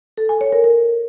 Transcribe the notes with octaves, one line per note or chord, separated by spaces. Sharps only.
A4
G#5
C#5
A#4
A#4